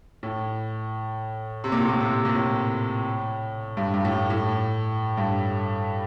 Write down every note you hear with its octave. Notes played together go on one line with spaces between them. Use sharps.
A2
C3
A#2
A2
A#2
C3
A#2
A2
G2
G2
A2
G2
A2
G2